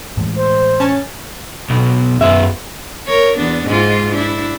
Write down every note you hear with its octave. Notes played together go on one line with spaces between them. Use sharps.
A2 E3 G#3
C5
C#4 C#5 A5
B1 B2
F#2 G#3 B3 E5
A#4 C#5
E2 B3 D4
G#2 G#3 F4
D4 E4